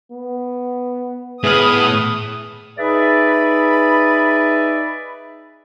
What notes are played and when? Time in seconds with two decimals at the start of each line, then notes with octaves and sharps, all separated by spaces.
0.12 B3
1.44 A2 B3 G#4 B4 B5 D#6 F6
2.78 D#4 G#4 B4 D5 E5 B5